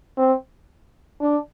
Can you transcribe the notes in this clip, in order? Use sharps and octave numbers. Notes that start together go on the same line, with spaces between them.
C4
D4